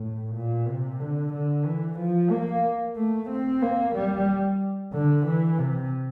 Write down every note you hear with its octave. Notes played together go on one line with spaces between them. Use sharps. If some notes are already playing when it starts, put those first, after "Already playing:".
Already playing: A2
A#2
C3
D3
D3
E3
F3
A#3
A3
C4
A#3
G3
D3
E3
C3